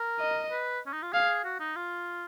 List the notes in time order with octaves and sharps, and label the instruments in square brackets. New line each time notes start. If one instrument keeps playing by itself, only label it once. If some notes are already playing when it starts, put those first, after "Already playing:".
Already playing: [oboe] A#4
[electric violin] D#5
[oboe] B4
C#4
D#4
F4
[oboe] G#4 [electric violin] F5
[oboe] F#4
D#4
F4